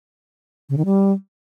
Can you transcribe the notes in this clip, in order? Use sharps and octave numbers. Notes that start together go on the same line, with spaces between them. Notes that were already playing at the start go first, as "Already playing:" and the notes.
C#3
D#3
G3